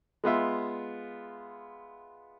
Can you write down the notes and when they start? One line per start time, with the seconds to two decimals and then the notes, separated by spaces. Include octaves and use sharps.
0.24 G#3 B3 F4 E5